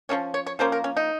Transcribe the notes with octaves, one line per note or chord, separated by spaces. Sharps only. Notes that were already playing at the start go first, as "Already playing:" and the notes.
F3 A#3 C#4 C#5
C#5
C#5
F3 A#3 C#4 C5
A#4
C#4
D#4